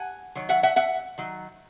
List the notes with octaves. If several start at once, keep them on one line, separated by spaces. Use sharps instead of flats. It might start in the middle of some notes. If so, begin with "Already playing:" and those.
Already playing: F#5 G#5
D#3 F#3
E5 F#5
E5 F#5
E5 F#5
D#3 F#3